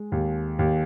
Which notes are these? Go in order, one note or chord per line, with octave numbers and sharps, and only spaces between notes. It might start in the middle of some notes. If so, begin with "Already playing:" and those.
Already playing: G#3
D#2
D#2